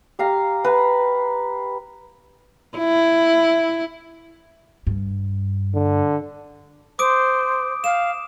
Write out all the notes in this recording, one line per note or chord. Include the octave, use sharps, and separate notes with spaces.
G4 F5 A#5
B4 A#5
E4
G2
D3
C5 D6 D#6 D7
F5 E7